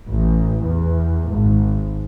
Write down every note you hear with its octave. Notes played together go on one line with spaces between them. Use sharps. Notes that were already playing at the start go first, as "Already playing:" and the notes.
A1
E2
G#1